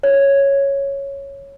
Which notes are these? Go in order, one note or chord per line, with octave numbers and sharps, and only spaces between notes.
C#5